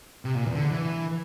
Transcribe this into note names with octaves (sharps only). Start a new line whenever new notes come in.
C3
A#2
E2
D3
E3